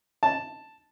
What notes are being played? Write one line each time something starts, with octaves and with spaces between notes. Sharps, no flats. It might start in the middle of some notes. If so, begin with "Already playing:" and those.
A5